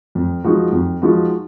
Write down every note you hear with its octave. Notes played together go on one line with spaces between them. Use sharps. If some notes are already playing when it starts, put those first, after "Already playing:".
F2
F3 G#3 D#4 F#4
F2
F3 G#3 D#4 F#4